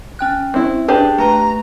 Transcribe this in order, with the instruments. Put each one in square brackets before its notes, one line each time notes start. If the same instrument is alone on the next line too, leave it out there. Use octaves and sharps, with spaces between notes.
[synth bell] C#4 G5 F#6
[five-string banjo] C4 E4
[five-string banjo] D4 G4 [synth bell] G#4 B4
[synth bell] A3 B4 [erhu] A#5